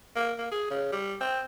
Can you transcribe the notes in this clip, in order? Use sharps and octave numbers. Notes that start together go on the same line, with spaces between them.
A#3
A#3
G#4
C#3
G3
C4